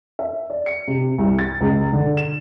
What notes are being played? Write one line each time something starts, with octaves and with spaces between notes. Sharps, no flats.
E5
D5
C#7
C3
C2
A6
C#2
D3
E7